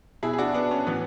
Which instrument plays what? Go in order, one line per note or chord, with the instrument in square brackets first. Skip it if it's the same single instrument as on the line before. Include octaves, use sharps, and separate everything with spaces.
[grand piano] B2 E4 G#4
G#4
D4 F#4
B3 D4
C#4
A2 E3 B3